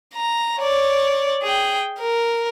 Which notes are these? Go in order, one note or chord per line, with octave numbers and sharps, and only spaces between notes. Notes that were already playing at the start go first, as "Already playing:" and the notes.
A#5
C#5 D5
G#4 G5
A#4